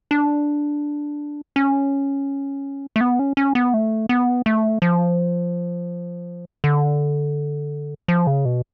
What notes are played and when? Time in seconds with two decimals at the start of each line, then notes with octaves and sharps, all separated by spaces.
0.11 D4
1.56 C#4
2.96 A3
3.01 B3
3.19 C#4
3.37 C#4
3.55 B3
3.74 A3
4.09 B3
4.46 A3
4.82 F3
6.64 D3
8.08 F3
8.27 C#3
8.45 B2